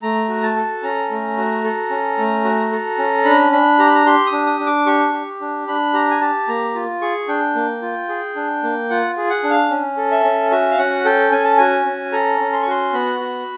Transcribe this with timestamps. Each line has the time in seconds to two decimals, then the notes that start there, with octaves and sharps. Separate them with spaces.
0.02 A3 A#5
0.29 F#4
0.42 A5
0.56 A4
0.83 C#4 A#5
1.10 A3
1.37 F#4
1.64 A4
1.90 C#4
2.18 A3
2.44 F#4
2.72 A4
2.98 C#4
3.24 D4 B5
3.52 D4 B5
3.79 G4 A#5
3.87 B5
3.95 A#5
4.06 G4 C6
4.26 D#6
4.32 D4
4.46 D#6
4.60 D4
4.66 D6
4.86 G4 C#6
5.13 G4
5.41 D4
5.68 D4 B5
5.93 G4 A#5
6.10 G#5
6.21 G4 A5
6.48 A#3 A#5
6.75 F4
7.01 G#4 C#6
7.28 D4 G5
7.55 A#3
7.82 F4
8.09 G#4
8.36 D4
8.63 A#3
8.90 F4 F#5
9.17 G#4
9.30 F#5
9.44 D4
9.50 F5
9.70 C#4
9.97 A4
10.11 E5
10.24 C#4
10.51 F#4 E5
10.71 F5
10.78 C#4 F#5
11.05 A4 G5
11.32 C#4 G#5
11.44 A5
11.57 F#4 G#5
11.85 C#4
12.12 A4 A#5
12.40 C#4
12.53 C6
12.62 C#6
12.67 F#4 C6
12.93 B3 B5
13.20 F#4